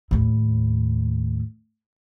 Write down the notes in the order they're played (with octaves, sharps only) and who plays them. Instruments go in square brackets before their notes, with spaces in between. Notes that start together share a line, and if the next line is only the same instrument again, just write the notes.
[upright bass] D#2 A2